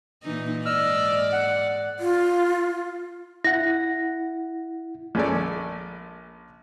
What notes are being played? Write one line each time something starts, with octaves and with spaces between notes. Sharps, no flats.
A#2 E3 D#4
G#2 D5 D#5 E6 F6
F#5
F4
E4 F#5 A#6
A#1 G#3 C#4 A4 D5